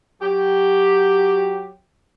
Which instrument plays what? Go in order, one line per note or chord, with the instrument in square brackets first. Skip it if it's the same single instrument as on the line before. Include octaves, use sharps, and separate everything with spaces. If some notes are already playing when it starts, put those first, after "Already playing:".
[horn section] F#3 G4